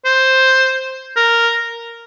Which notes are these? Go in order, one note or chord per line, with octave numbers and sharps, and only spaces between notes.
C5
A#4